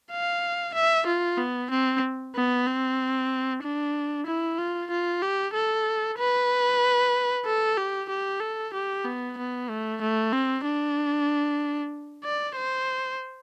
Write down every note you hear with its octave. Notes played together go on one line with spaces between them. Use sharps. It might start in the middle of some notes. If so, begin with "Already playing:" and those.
F5
E5
F4
B3
C4
B3
C4
D4
E4
F4
F4
G4
A4
B4
A4
G4
G4
A4
G4
B3
B3
A3
A3
C4
D4
D5
C5